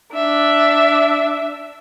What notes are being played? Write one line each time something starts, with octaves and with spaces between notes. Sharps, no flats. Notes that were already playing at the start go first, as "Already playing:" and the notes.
D4 E5